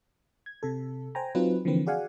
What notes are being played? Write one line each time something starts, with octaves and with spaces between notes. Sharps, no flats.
G#6
C3 A4
C5 G5 G#5 A#5
F#3 C4 D#4 F4 B4
D3 E3 F3 A#3 C4 B4
F#4 G#4 D5 F5 F#5 G#5